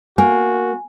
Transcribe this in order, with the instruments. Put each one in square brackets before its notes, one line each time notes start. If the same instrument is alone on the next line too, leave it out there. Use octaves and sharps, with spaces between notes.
[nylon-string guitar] A#3 [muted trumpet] F#4 [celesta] G#5